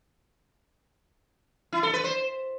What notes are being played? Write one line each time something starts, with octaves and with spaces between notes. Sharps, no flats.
E4
A4
B4
C5